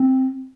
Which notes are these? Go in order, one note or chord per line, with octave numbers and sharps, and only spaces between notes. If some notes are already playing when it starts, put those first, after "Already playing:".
Already playing: C4